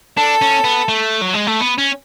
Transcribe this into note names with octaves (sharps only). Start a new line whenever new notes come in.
D4 A4
C#4
B3
A3
F#3
G#3
A3
B3
C#4